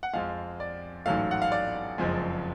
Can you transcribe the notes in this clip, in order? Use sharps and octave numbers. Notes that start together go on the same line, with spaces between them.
F#5
F2 F3 G#3 F5
D5
A1 G#2 F#3 A3 F5
F#5
F5
D5
F#1 F2 F3 G#3